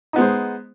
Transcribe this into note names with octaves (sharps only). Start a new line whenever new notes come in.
G#3 B3 D#4 C5